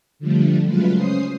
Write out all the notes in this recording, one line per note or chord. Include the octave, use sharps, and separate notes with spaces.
D3 F3 G3 A3
C#3 F#3 G#3 A3 F4 B4
C#4 C5 D#6 C7